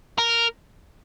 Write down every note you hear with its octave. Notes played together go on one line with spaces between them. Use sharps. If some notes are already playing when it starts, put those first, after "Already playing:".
A#4